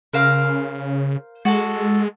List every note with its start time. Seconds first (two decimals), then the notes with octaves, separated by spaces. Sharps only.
0.13 C#3 A#4 C5 F5
1.45 G#3 F#4 A4